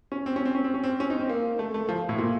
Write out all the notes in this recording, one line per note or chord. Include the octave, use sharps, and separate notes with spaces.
C#4
C4
C#4
C4
C#4
C4
C#4
C4
C#4
D#4
C4
A#3
A3
A3
F3
A2
A#2